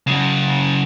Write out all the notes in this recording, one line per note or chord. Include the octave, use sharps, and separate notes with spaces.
C#3 F#3